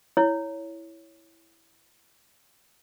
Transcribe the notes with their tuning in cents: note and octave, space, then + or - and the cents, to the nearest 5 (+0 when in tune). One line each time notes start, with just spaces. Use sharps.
E4 +0 C#5 +5